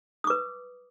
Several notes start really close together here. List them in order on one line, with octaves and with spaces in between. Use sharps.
D#6 D6 B4